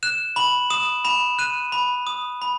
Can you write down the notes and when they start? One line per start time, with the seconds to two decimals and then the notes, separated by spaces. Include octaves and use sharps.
0.03 F#6 E7
0.36 B5 F#7
0.70 D#6 E7
1.05 B5 E7
1.39 F#6 D#7
1.72 B5
2.07 D#6
2.42 B5